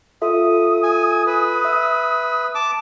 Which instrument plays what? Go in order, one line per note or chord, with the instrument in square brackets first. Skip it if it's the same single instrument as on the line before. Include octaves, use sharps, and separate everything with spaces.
[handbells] F4 A4 E5 [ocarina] D#6
[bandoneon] G#5
B4
[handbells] E5 E6
[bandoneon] A5 D6